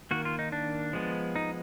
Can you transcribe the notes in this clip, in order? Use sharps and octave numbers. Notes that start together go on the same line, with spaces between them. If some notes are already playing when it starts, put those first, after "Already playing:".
D#3 A#3 F#4
F4
D#4
D4
F3 G#3 B3
D#4